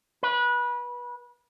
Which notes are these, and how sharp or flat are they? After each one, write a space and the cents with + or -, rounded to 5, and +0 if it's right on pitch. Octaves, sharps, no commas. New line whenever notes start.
B4 -25